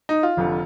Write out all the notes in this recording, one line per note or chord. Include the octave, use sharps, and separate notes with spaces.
D#4
F4
F1 F2 D3